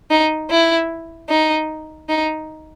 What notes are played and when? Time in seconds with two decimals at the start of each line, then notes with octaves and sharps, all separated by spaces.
0.10 D#4
0.50 E4
1.29 D#4
2.09 D#4